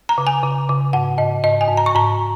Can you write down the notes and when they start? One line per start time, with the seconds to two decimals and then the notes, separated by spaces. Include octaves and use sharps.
0.09 A#5
0.18 C#3
0.27 G#5
0.43 C#3
0.69 C#3
0.93 G#2 F#5
1.18 G#2 D#5
1.44 G#2 D#5
1.61 G#5
1.68 G#2
1.77 A#5
1.86 C#6
1.95 G#2 A#5